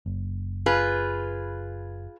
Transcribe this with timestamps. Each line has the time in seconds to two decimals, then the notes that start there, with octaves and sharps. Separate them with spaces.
0.06 F#1
0.66 F4 G#4 B4